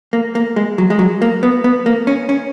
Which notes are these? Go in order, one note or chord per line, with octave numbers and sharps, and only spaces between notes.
A#3
A#3
G#3
F#3
G#3
F#3
A#3
B3
B3
A#3
C#4
C#4